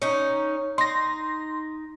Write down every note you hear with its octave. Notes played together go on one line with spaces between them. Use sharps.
C#4 D#4
D#4 C6 A#6